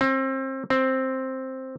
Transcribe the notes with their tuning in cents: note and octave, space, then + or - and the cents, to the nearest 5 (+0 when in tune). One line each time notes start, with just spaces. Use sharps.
C4 +30
C4 +5